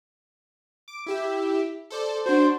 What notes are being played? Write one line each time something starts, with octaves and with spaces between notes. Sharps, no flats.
D6
E4 G4 E5
A4 C5 D5
D4 F#4 C5